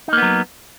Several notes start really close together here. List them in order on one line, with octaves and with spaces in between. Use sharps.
D#4 A#3 B3 F#3